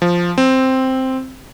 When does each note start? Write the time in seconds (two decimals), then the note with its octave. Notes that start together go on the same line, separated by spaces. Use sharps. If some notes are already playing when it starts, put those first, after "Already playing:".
0.02 F3
0.38 C4